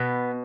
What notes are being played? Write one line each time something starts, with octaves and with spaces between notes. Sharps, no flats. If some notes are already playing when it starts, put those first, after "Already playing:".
Already playing: B2 B3